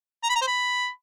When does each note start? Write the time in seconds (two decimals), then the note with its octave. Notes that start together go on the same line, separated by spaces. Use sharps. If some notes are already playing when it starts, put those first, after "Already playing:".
0.23 A#5
0.29 B5
0.35 A#5
0.41 C5
0.47 B5